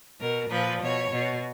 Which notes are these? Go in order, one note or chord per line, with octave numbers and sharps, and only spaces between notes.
B2 A#4
A#2 F3 B4
B2 C#5
B2